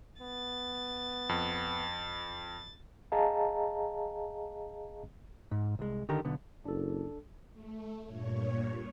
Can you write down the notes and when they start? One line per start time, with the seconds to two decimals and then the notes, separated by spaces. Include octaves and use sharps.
0.21 B3 A6
1.29 F2
3.12 G#4 D#5 F5 A5 A#5
5.51 G#2
5.79 C2 G#3
6.09 D3 D#3 G4 A#4
6.25 B1 D3 B3
6.65 F#1 D4 A4
7.53 A3
8.05 G2 A#2 C#5